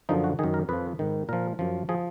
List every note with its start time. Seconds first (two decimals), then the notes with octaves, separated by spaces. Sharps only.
0.09 F#2 D3 F3 D#4
0.24 F#4
0.39 D#3 G#4
0.44 F#2
0.54 A#4
0.69 F2 F3 B4
0.99 G#2 D#3
1.29 A#2 F3 A#4
1.59 F#2 F3
1.89 F3 G#4